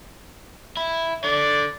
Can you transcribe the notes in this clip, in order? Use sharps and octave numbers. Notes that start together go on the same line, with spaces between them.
E4
D3 D5